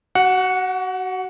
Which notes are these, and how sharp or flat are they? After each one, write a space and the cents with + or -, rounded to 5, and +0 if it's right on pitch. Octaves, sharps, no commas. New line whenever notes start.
F#4 +25 F#5 -10